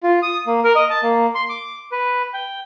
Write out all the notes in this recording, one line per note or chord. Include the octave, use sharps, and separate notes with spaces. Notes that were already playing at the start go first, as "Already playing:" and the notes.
F4
D#6
A#3
A#4
D#5
A5
A#3
C6
D6
B4
G5